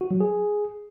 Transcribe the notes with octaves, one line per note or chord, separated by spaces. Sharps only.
F#4
F#3
G#4